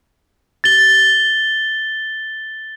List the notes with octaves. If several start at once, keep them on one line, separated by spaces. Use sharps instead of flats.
A6 G7